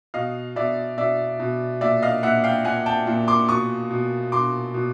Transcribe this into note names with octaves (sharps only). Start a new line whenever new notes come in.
B2 D#5 F5
B2 D5 E5
B2 D5 E5
B2
A#2 D5 E5
D#5 F5
A#2 E5 F#5
F5 G5
A#2 F#5 G#5
G5 A5
A#2
C6 D6
B2 C#6 D#6
B2
B2 C6 D6
B2